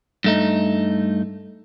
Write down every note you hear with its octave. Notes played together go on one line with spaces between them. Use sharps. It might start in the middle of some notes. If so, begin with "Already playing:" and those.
G2 A3 D#4